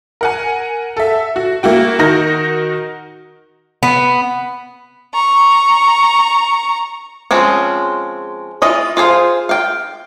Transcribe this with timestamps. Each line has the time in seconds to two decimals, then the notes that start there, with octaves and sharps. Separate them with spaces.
0.21 A#4 F#5 G#5
0.97 A4 E5
1.36 F#4
1.63 A#3 E4 F#4 G5
1.99 D#3 D#4 F#4 A#4 G6 A#6
3.83 B3
5.14 A#5 C#6
7.31 F3 G#3 C4 C#4
8.62 E3 F4 D#5 B5
8.97 F4 G#4 C5 F5
9.49 F5 G5